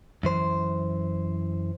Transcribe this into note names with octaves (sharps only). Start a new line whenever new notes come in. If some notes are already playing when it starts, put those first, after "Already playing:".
F#2 E3 C5 C6